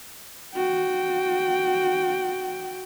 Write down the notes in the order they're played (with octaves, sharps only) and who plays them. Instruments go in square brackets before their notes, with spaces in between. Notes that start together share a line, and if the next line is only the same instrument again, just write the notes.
[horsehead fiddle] F#4 G5